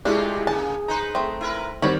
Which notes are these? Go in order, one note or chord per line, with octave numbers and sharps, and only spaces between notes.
C3 G#3 A3 D4 E4 F4 G4 G#4
C#3 A#3 G#5 A5
D#4 B4 C5 A#5
A3 C4
E4 A#4 B4
D#3 F#3 G3 C4 C#5 D5 B5